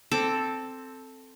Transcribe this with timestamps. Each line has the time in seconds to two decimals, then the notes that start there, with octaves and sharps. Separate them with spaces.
0.11 C4 A4 A5 D6